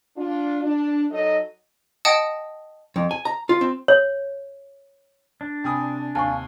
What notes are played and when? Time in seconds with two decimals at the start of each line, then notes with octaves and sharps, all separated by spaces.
0.17 D4 F4
0.63 D4
1.11 F#3 D#4 A4 D#5
2.05 D#5 F#5 G5 A5 D#6
2.96 F2
3.11 G#5
3.25 A#5
3.49 F4
3.61 C4
3.88 C#5
5.41 D4
5.64 C3 G4 A#4 G#5 B5 D#6
6.15 D#2 C3 C#5 F5 G#5 A5 C#6